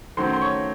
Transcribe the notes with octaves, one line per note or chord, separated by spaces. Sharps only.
D#3 F#3 A3 C#4 C5 C6
C6
C#5 C#6